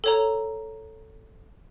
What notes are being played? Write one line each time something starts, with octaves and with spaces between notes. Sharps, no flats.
A4 C#5 A#5